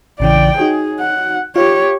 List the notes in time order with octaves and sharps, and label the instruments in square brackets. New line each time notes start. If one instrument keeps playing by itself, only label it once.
[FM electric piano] A1 C#3 E3 [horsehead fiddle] D5 G5
[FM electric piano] D#4 F#4 C#5 [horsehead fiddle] G#4
[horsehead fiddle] F#5
[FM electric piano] F4 [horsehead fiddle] G4 C#5